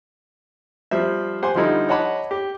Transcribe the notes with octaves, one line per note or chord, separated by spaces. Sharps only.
F3 G3 C5 E5
G4 C5 F#5 G#5 C6
D3 F3 G3 D#4 E4
C#5 D#5 F#5 A5 B5 D6
G4